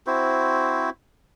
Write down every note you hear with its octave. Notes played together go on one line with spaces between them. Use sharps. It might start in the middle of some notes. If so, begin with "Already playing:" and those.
C4 E4 F#4 C5